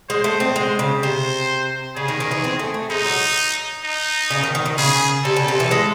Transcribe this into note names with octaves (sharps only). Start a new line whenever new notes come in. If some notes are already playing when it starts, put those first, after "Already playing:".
G#3 C5
A3
C4
G#3
C#3
C3 C5
C#3 G#4
D#3
D#3
E3
C4
A3
A3
G#3 D#4
F#3
D#4
C#3
D#3
D#3
D#3
C#3 G#4
C3 A4
C#3
C3
E3
G#3